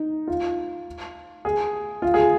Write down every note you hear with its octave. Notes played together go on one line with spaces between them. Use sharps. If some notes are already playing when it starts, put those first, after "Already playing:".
Already playing: D#4
F4
G#4
F4
G#4